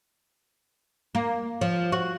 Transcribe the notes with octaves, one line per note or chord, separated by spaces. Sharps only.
A#3
F3
F#4